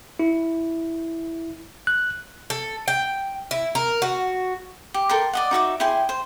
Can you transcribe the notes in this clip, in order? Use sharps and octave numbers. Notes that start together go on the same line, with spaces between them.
E4
F#6
A4
G5
E4
A#4
F#4
G4
A4 A#4 G5 C6
D5 D#5 F#5
D#4 F#4 E5 D6
E4 G#4 G5 C6
C5